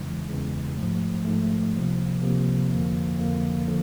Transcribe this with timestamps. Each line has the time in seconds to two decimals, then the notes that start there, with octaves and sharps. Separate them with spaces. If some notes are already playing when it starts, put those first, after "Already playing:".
Already playing: E2 C#3 E3 G#3
0.28 E2 C#3 E3 G#3
0.76 G#2 F3 A3
1.25 G#2 F3 A3
1.73 C#2 C3 F3 A#3
2.21 C#2 C3 F3 A#3
2.71 F2 D3 F3 A#3
3.19 F2 D3 F3 A#3
3.67 D3 F3 A#3